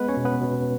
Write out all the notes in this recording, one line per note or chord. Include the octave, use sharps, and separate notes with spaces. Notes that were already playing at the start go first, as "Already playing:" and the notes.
Already playing: G#3 B3 B4
C#4 C#5
B2
B3 B4
B2